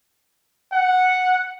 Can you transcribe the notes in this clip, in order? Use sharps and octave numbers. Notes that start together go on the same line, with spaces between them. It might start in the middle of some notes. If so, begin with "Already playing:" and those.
F#5